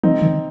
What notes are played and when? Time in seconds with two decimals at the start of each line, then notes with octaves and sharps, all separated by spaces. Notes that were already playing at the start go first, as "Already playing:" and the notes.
0.03 F3 C4 D#4
0.22 D#3